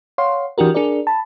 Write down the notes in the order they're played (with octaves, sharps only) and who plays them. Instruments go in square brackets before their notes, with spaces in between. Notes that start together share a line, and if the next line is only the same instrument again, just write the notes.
[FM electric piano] C#5 F5 F#5 C6
E3 D4 F#4 G4 A#4
D4 G#4 A#4 D5
A5 B5